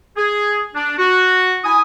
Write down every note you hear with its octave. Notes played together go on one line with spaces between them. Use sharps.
G#4
D4
F#4
E4 G#5 D#6